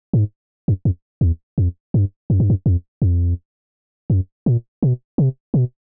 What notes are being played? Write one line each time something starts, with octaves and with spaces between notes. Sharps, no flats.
G#2
F#2
F2
E2
F2
G2
F#2
G2
F#2
F2
F2
F#2
A#2
B2
C3
B2